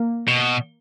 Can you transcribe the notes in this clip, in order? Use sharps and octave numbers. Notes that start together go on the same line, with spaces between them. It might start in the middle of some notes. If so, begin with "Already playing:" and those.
Already playing: A#3
B2